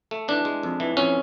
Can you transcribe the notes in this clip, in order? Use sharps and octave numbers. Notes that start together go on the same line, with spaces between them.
A3
E3 D4
G#3
F2
E3
F2 C#4